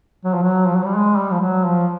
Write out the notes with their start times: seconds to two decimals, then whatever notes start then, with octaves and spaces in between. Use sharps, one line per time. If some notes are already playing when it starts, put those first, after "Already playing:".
0.25 F#3
0.34 F3
0.43 F#3
0.66 F3
0.75 F#3
0.85 G3
0.95 G#3
1.17 G3
1.31 F3
1.41 F#3
1.64 F3